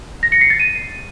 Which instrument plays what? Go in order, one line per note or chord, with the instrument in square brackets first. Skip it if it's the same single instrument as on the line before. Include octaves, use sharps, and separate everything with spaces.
[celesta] A#6
C#7
C7
A6
D#7